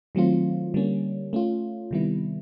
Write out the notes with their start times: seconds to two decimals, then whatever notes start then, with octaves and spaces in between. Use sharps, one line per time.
0.15 D#3 F#3 A3 C4 F4
0.74 D3 G3 A#3 C#4
1.33 A3 C#4 F4
1.91 C3 D#3 G3 B3 E4